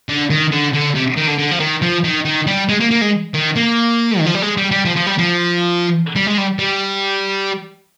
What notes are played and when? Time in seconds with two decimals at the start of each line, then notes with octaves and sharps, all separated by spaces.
0.09 D3
0.30 D#3
0.52 D3
0.74 D3
0.96 C3
1.17 D#3
1.28 D3
1.38 D3
1.52 F3
1.60 D#3
1.82 F3
2.04 D#3
2.25 D#3
2.47 G3
2.69 G#3
2.80 A#3
2.91 A#3
3.01 G#3
3.34 D#3
3.56 A#3
4.19 D#3
4.26 F3
4.35 G3
4.42 G#3
4.57 G3
4.71 G3
4.85 F3
4.96 F3
5.07 G3
5.18 F3
6.16 G3
6.27 G#3
6.38 G3
6.59 G3